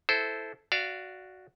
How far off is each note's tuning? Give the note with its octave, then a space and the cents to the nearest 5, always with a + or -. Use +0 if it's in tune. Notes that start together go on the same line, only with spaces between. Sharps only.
E4 +0 A4 -10 C5 -15
F#4 +0 D5 +0 F5 -30